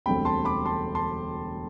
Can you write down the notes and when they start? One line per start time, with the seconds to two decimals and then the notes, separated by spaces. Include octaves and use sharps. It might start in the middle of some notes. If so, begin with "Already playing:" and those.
0.06 E1 D2 D3 G3 C4 G5 B5
0.25 A5 C6
0.45 B5 D6
0.65 A5 C6
0.95 A5 C6